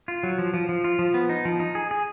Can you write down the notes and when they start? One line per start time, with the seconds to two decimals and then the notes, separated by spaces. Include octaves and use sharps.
0.08 F4
0.23 F#3
0.39 F3
0.54 F3
0.69 F3
0.84 F4
0.99 F3
1.14 B3
1.29 D#4
1.45 F3
1.60 D#4
1.75 G#4
1.91 G#4